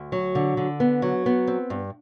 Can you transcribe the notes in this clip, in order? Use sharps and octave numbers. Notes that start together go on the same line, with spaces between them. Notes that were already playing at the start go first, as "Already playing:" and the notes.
Already playing: D2
F#3
D3
D3
B3
F#3
B3
C4
G2